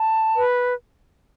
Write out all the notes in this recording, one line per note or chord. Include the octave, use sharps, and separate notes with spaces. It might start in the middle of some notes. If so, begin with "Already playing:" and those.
Already playing: A5
B4